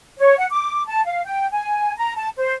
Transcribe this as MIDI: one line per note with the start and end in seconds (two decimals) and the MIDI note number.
0.18 0.37 73
0.37 0.47 78
0.50 0.84 86
0.87 1.05 81
1.06 1.23 77
1.24 1.47 79
1.51 1.93 80
1.97 2.15 82
2.16 2.29 81
2.37 2.53 72